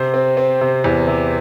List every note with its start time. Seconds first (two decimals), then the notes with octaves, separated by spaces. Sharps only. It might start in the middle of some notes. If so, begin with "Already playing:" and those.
Already playing: C3 C5
0.14 C4
0.37 C4
0.61 C3
0.84 E2
1.08 C3